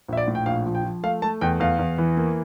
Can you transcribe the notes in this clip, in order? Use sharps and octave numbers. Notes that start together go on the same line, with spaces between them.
A#1 E5
D5
A2
G5
A#1 F5
F3
G5
F3
A3 F5
A3 A5
E2 G5
E2 F5
E2
E3
A#3